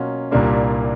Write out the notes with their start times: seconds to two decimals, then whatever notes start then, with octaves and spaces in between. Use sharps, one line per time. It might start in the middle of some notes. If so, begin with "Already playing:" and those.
Already playing: B2 F#3 A#3 C#4 F4
0.31 C2 A#2 G3 A#3 D4